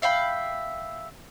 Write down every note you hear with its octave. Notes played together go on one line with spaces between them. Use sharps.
E5 F5 G5 B5